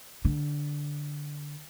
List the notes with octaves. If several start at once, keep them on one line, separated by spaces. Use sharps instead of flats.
D3